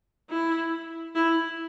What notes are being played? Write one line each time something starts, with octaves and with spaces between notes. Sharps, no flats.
E4
E4